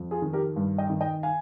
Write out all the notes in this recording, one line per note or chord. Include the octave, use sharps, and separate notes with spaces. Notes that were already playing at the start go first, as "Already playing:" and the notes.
Already playing: F2
F4 G#4
D#3
G4 A#4
G2
D#5 G5
D#3
D#5 G5
F5 G#5